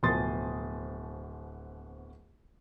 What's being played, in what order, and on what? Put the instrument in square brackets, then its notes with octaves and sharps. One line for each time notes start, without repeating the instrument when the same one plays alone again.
[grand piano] D1 B2 F3 C6 D#6 A6